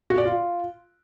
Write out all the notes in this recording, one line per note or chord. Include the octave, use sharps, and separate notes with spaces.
F#4
D5
F4